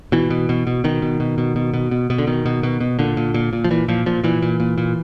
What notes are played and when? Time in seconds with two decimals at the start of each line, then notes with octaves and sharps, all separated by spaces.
0.12 B2 E3
0.30 B2
0.49 B2
0.67 B2
0.84 B2 D#3
1.02 B2
1.20 B2
1.38 B2
1.56 B2
1.74 B2
1.91 B2
2.10 B2
2.18 D3
2.27 B2 D#3
2.46 B2
2.63 B2
2.80 B2
2.99 A#2 D3
3.17 A#2
3.34 A#2
3.53 A#2
3.64 F3
3.70 A#2 E3
3.88 A#2 F3
4.06 A#2 F3
4.24 A#2 E3
4.42 A#2
4.60 A#2
4.78 A#2